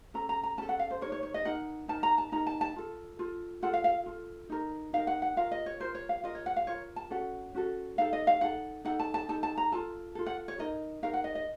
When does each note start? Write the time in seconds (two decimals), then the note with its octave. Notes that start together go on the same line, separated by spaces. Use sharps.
0.14 C#4 A4 A#5
0.29 A#5
0.43 A#5
0.58 C#4 A4 A5
0.69 F#5
0.79 F5
0.91 C5
1.01 A#4 C#5
1.06 D#4
1.12 C#5
1.23 C#5
1.34 D#5
1.45 D#4 A#4 F#5
1.88 D#4 A#4 A5
2.03 A#5
2.18 A5
2.32 D#4 A#4 A#5
2.47 A5
2.61 A5
2.76 F4 A4
3.19 F4 A4
3.62 F4 A4 F#5
3.73 F5
3.84 F5
4.06 F4 A4
4.50 D#4 A#4
4.93 D#4 A#4 F5
5.07 F#5
5.22 F#5
5.37 F4 A#4 F5
5.51 D#5
5.66 C#5
5.80 F4 A#4 C5
5.95 C#5
6.09 F5
6.24 F4 A#4 D#5
6.35 C#5
6.46 F#5
6.56 F5
6.67 F4 A#4 C#5
6.96 A5
7.10 C#4 F#4 A4 F#5
7.54 C#4 F#4 A4
7.98 D#4 A4 F5
8.13 D#5
8.27 F5
8.41 D#4 A4 F#5
8.85 D#4 A4 F#5
9.00 A5
9.14 A5
9.29 D#4 A4 A5
9.43 A5
9.58 A#5
9.72 F4 A4 A5
10.15 F4 A4
10.26 F#5
10.48 C#5
10.59 D#4 A#4 D#5
11.02 D#4 A#4 F5
11.14 F#5
11.24 D#5
11.35 D#5